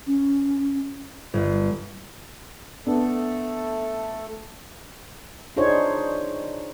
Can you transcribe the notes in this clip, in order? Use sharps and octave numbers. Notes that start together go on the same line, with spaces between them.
C#4
G1
A3 B3 D4 A4
D4 D#4 F4 G#4 C5 C#5